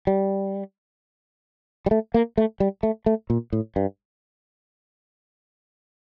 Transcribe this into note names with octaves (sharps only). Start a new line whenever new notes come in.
G3
G3
A3
A#3
A3
G3
A3
A3
A#2
A2
G2